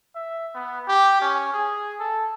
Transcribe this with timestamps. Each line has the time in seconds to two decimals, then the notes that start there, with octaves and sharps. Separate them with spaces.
0.15 E5
0.54 B3
0.88 G4
1.22 C#4
1.53 G#4
2.00 A4